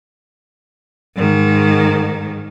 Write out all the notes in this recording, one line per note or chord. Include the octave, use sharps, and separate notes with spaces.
G#2 D#3